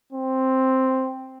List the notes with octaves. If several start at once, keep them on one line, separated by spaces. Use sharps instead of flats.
C4